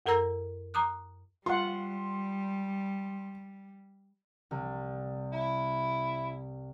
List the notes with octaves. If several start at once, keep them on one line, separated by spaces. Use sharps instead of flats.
F#2 A4 A#4 A#5 E6 A#6
A#5 D6 D#6 F#6
G3 F4 F#5 C6
C2
E4